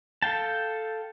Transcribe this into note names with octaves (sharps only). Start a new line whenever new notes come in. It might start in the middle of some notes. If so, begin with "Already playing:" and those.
A4 F5 G5 A5